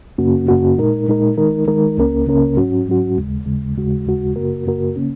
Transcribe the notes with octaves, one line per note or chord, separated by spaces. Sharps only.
F#2 C#3 A#3 C#4 F#4
F#2 C#3 A#3 C#4 F#4
A#2 G#3 D#4 A#4
A#2 G#3 D#4 A#4
D#3 G#3 D#4 A#4
D#3 G#3 D#4 A#4
C#2 C#3 A#3 C#4 A#4
C#2 C#3 A#3 C#4 A#4
G#2 F#3 C#4 F#4
G#2 F#3 C#4 F#4
D#2 C#3 G#3
D#2 C#3 G#3
D#2 C#3 G#3 F#4
D#2 C#3 G#3 F#4
F#2 C#3 A#3 F#4 A#4
F#2 C#3 A#3 F#4 A#4
C#3 A#3 C#4